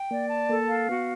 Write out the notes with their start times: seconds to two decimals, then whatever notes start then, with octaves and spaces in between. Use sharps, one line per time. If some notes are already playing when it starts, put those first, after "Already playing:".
Already playing: G5
0.10 A#3 D5
0.30 A5
0.49 A#3 A4
0.69 F5
0.89 B3 F#4